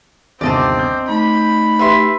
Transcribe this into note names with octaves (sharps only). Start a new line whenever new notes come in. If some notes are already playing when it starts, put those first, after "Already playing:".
G1 D#2 C3 C4 D5 D#5 A5
G6
A3 D#4 B5
G4 B4 E5 C6